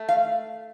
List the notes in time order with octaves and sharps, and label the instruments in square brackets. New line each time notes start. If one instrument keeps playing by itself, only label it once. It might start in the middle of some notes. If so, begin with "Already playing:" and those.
Already playing: [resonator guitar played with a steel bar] A3
F5